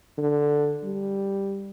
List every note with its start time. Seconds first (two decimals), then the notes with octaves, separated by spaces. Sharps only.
0.18 D3
0.84 G3